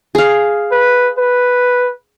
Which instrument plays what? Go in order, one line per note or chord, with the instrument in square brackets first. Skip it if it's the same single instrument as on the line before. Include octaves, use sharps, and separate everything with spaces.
[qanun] G#4 F5
[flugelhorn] B4
B4